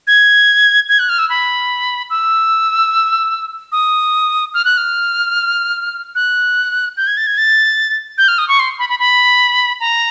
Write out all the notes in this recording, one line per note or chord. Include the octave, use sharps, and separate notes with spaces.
G#6
G#6
F#6
F6
E6
B5
E6
D#6
F6
F#6
F6
F#6
G6
G#6
A6
G#6
A6
G6
F6
D#6
C#6
C6
B5
B5
B5
A#5